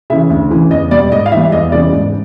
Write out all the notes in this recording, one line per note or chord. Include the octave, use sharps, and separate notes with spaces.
C#3 E3 E5
D2
C#3 E3
E2 D#5
B2 G3 D5
G#2 D#5
F5
E3 G3 E5
E5
E2 D#5
C#3 E3 G3 D5
G#2